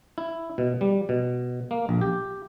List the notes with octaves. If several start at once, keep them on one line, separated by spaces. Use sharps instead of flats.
E4
B2
G3
B2
A#3
A#1
G4